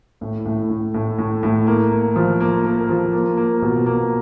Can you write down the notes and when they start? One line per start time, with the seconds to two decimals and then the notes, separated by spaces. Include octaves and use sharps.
0.21 A2
0.45 A2
0.69 A2
0.94 A2
1.18 A2
1.43 A2
1.67 A#3
1.92 A#3
2.16 F3
2.40 A#3
2.65 A#3
2.89 F3
3.13 A#3
3.37 A#3
3.62 B2
3.86 A#3